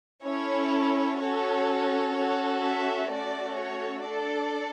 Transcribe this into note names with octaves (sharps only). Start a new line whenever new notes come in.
C#4 E4 A4 C#5
C#4 F#4 A4 C#5
C#4 F#4 A4 C#5
C#5 E5
A3 C#4 F#4 A4 D5
C#5
D4 A4 D5